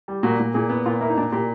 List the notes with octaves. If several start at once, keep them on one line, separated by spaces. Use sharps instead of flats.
G3
A#2 F#4
A#2
A#2 G#4
B3
A#2 F4
A#3 E4
D#4
A#2 D4
A#2 G4